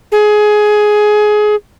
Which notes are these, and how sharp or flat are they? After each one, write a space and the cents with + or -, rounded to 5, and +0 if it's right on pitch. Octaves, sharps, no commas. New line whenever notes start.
G#4 +20